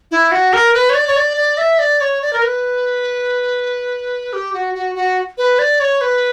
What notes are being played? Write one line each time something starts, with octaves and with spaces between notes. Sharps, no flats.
E4
F#4
A#4
B4
C#5
D5
C#5
D5
D5
E5
D5
C#5
D5
A#4
B4
G4
F#4
F#4
F#4
B4
D5
C#5
B4